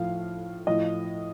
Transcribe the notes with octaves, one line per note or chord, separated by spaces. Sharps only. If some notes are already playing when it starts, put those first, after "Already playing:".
Already playing: A2 F3 F5
A2 F3 D#5